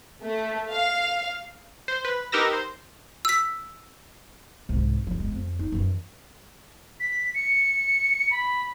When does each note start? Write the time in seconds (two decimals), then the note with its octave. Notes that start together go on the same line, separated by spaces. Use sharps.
0.23 A3
0.71 F5
1.88 C5
2.05 B4
2.32 D#4 G4 A#4 B4 E6 A#6
2.53 C5
3.25 E6 B6
4.69 C2 G#2
5.07 D3 F3
5.20 G#3
5.32 F2
5.59 D#4
5.72 F#2 E3
7.00 B6
7.35 C#7
8.31 B5